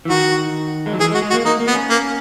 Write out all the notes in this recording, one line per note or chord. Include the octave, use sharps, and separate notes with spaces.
E3
D#3 F#4
G#3
F#3
E3 G#4
G#3
F#4
G#3
F#4
A#3
A#3 D#4
A#3
B3
C#4
A#3